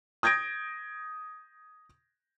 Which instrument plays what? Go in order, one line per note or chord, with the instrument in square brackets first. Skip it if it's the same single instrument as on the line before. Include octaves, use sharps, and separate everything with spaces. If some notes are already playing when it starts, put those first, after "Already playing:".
[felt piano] D#6 G6 G#6 A#6 D7